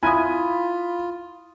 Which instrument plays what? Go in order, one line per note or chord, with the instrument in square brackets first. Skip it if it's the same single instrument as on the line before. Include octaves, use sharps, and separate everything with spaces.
[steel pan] E4 G#5 [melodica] F4 [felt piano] B5 D#6